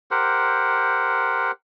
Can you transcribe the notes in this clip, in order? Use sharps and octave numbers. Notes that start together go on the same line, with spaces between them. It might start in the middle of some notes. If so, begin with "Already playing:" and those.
G4 A#4 C5 F#5